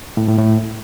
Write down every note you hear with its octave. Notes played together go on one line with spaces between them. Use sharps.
A2
A2
A2